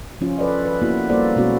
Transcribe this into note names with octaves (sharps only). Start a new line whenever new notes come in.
F3 C#4 F4
A4 B4 D5 D#5
B4
A#3 B3 E4 F#4
G3 A#3 A4 C5 D5
B2 G#3 B3 C#4 F#4